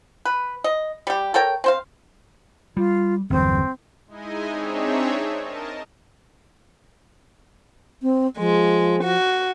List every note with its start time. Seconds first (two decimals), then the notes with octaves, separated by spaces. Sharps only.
0.25 B4
0.64 D#5
1.07 G3 G4
1.34 A4 A#4 C#5 G5
1.64 C4 C5 F5
2.77 G3 F4
3.30 G1 E2 F#3 C4
4.07 G#3 D#4 E4 D#5 G#5
4.49 C4 D4 D#4 G#4 C#5 E5
5.40 A#4 D#5 A5
8.02 C4
8.38 F3 G#3
9.02 F#4